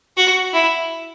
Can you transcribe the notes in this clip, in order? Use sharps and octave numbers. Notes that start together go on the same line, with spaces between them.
F#4
E4